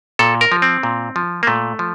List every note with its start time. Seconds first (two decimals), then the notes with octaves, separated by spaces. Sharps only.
0.19 A#2 A4
0.41 A#4
0.52 F3
0.62 C4
0.83 A#2
1.16 F3
1.43 A#3
1.47 A#2 A3
1.79 F3